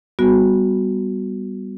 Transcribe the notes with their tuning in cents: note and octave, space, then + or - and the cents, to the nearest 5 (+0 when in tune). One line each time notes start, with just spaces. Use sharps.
G3 +0 B3 +0 F#4 -5